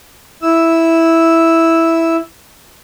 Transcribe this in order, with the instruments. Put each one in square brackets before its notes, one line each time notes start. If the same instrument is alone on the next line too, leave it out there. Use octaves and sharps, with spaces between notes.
[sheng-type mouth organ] E4 E6